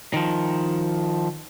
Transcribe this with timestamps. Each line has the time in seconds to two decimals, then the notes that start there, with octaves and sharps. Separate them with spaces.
0.14 D#3 F3